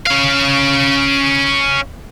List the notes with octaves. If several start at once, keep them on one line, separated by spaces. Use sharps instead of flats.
C#4 F5